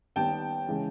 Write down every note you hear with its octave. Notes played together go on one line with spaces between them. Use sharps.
D#2 D#3 G3 B3 G5 A5
C#3 E3 G#3